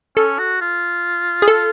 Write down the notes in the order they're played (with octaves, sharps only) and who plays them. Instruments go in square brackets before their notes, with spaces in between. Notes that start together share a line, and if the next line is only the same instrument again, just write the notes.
[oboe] C#4 [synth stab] A4
[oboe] F#4
F4
[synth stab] G#4
A4